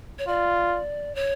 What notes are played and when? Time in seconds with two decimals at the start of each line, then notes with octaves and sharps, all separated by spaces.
0.19 C#5
0.28 F4 D5
1.15 C#5